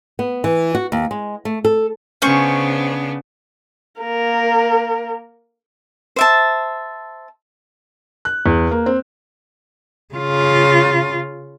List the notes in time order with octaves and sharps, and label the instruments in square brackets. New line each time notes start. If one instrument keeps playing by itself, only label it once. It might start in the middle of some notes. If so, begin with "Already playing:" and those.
[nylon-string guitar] B3
E3
F#4
D#2
G#3
A3
A4
[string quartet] C#3 B3 D4 [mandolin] C#4 C5 C#6
[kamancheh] A#3 A#4
[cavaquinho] C5 E5 A5
[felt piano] F#6
E2
A#3
C4
[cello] C#3 F4